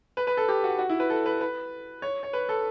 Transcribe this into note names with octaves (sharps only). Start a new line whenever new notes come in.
B4
B4
A4
G4
F#4
F#4
E4
B4
A4
B4
B4
C#5
C#5
B4
A4